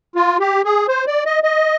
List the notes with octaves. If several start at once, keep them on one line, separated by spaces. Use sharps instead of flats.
F4
G4
G#4
C5
D5
D#5
D#5